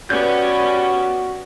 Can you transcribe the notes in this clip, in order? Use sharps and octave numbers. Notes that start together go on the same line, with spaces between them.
B3 C#4 F#4 G4 B4 D5 G6